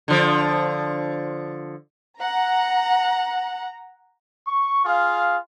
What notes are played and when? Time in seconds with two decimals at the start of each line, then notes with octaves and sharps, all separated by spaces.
0.08 D3 F3
2.20 F#5 A#5
4.47 C#6
4.85 F4 G#4 F5